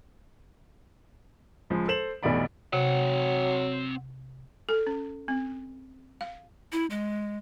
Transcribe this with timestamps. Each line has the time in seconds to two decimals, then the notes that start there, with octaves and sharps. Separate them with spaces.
1.70 C#2 F3 G#3
1.88 A4 C5 E7 F#7
2.23 F1 B1 E3 B3 D5 B5
2.73 C3 F#3 C4 F#5
4.69 A4
4.87 C#4
5.28 C4
6.21 F5
6.72 E4
6.90 G#3